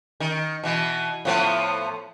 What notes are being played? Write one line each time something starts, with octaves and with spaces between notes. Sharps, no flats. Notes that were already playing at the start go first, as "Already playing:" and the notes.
D#3
B2 E3
A2 F3 B3